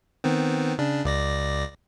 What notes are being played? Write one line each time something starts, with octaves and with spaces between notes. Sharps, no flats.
D#3 B3 C4
C#3 D4
C#2 D5 A#6